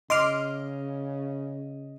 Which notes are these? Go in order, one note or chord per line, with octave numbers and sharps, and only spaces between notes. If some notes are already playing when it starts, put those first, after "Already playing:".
C#3 D#5 C6 D6 F6